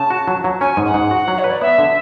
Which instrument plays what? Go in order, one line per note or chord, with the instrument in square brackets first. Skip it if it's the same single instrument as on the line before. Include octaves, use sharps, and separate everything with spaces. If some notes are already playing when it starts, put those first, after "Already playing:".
Already playing: [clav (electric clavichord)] C#3 [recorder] A5
[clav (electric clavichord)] F#4
F#3
F#3
[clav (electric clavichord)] C#4 [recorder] G#5
[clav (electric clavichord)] G#2
[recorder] F#5
[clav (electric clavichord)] G#2
F#4
F#3
[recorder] C#5
[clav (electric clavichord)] B4
[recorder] D5
[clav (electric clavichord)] B3 [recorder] E5
[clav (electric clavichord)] D3